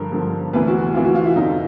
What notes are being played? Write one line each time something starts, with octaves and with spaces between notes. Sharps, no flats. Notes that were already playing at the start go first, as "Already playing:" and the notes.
Already playing: G2 D3 F3 A#4
G2 D3 F3
D2 C3 E3 B4
F#4
D2 C3 E3 F4
F#4
F4
E4
F2 D3 F#3 D#4